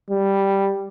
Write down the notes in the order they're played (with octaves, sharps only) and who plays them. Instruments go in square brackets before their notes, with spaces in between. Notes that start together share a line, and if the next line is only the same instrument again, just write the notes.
[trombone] G3